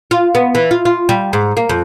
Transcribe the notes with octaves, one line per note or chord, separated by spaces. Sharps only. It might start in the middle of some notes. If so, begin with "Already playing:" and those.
F4
B3
E3
F4
F4
G3
G#2
A#3
F2